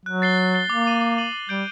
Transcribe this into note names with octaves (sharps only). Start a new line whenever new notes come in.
F#3 F#6
A6 C7 G7
F#6
A6 C7 G7
A#3 D6
A6 D#7 F#7
D6
A6 D#7 F#7
D6
G3 G6 D7 G7